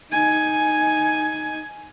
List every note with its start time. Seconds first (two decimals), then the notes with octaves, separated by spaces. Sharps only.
0.11 D#4 G#5